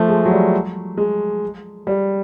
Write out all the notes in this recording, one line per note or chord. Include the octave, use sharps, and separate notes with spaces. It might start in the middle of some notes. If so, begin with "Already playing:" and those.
Already playing: F3 A3
G#3
F#3
G3
G#3
G3